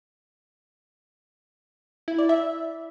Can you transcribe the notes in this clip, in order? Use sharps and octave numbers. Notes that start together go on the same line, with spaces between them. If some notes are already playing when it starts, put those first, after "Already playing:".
E4
D5
E5